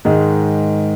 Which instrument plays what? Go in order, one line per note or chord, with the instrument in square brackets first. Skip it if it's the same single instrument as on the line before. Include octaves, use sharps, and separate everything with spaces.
[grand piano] G#2 D#3 G#3